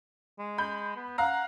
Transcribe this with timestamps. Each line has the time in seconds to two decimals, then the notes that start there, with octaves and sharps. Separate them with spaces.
0.39 G#3
0.58 B5 G6
0.96 B3
1.18 F5 F#5 A#5